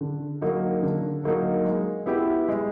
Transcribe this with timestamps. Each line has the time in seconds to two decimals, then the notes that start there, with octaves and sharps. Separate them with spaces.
0.01 D3
0.41 F#3 A#3 D#4
0.83 D3
1.24 F#3 A#3 D#4
1.65 G#3
2.06 B3 E4 G4
2.48 G#3